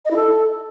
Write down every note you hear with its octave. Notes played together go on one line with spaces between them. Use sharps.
D#5
E4
A4